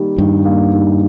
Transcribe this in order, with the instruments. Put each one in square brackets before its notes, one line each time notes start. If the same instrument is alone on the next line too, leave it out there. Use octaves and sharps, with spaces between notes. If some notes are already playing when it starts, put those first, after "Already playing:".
Already playing: [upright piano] D#3 G3 A#3
[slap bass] G2 [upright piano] D#3
[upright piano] A#3
D#3